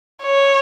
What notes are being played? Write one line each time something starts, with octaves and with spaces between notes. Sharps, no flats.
C#5